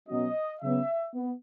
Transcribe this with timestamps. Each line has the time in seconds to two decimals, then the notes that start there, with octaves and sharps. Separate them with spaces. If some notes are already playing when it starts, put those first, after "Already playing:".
0.08 B2 F#3 C#4 D#5
0.61 C#3 F#3 B3 E5
1.12 B3